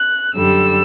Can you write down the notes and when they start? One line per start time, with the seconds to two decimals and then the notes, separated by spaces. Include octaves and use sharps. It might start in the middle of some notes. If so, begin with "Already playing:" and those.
Already playing: F#6
0.34 F#2 D3 G3 E6